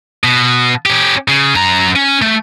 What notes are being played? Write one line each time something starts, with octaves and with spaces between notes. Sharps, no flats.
B2
C#4 G4
C#3
F#2 A#5
C#4
A3